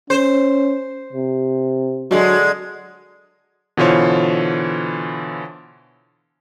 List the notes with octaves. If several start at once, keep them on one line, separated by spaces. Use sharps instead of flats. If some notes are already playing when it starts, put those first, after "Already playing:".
C#4 C5
C3
D3 F#3 G#3
B2 D3 E3 F4 C5 C#5